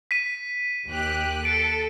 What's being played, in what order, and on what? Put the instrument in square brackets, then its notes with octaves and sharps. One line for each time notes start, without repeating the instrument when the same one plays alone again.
[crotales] B6 D#7
[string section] D#2 G4 F#6
[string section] A4 [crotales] D7